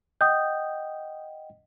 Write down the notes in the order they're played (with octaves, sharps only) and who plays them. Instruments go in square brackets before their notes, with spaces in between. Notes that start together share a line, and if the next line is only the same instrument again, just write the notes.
[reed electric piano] D#5 F#5 G5 [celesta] D#6 G6